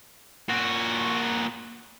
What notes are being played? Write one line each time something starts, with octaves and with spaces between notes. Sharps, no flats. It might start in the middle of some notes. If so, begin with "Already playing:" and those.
A#2 F#4